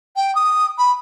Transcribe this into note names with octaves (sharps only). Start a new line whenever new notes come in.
G5
D#6
B5